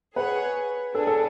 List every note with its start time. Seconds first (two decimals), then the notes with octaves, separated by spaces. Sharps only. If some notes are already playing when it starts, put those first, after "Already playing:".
0.16 G#4 B4 C#5 F#5
0.94 B3 D4 G#4 A4
1.07 A4